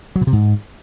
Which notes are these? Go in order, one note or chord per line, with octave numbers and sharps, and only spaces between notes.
F#3
B2
C3
G#2